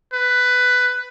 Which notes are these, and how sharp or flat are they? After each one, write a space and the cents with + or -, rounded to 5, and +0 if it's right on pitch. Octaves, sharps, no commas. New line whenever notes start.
B4 +10